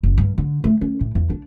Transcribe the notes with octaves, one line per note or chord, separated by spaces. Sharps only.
F#1
G2
D3
A3
C#4
A2
E2
D4